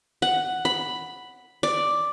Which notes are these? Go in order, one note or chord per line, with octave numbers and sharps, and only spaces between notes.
F#5
B5
D5